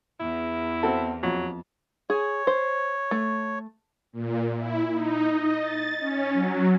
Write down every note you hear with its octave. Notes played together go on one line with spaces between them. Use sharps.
E2 E4
C4 F#4 A4
F2 F#3
G#4 C#5
C5
A3
A#2
E4
D#4
D#5
A6
C#4
F#3